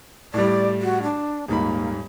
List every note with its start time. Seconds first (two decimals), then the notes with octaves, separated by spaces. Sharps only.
0.34 A2 G3 D5
0.82 F#4
1.03 D4
1.48 D#1 G#2 A#3 B5